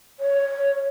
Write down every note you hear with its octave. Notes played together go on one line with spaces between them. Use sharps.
C#5